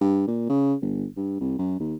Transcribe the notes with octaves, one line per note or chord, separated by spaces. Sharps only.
G2
A#2
C#3
G1
G2
C2
F#2
D#2